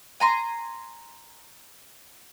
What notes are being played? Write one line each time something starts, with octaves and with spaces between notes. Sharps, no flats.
G#5 A#5 C6